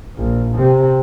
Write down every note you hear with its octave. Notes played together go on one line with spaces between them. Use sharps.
A#1
C3